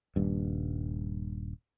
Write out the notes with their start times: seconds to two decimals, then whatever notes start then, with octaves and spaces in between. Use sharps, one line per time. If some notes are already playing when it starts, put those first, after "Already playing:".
0.16 D#1 G2